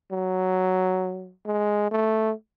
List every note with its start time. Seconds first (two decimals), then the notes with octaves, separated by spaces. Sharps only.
0.11 F#3
1.46 G#3
1.91 A3